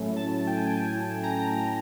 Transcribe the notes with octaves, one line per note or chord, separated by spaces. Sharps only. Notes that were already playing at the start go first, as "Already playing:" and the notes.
Already playing: A2 F#3 A3 C#4 E4
A5
G5
G#5
G5
G#5
A#5